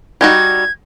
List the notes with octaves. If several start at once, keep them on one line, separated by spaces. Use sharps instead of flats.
G3 D#4 F#4 G#6